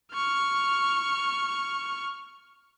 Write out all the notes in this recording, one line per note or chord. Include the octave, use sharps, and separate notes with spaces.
C#6 F6